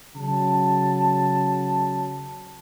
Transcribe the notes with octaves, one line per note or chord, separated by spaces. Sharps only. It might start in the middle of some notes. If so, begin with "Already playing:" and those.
C#3 F#3 A5